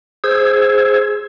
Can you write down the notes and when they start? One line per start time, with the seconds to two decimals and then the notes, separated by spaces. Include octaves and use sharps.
0.24 G#4 C5 E6 G#6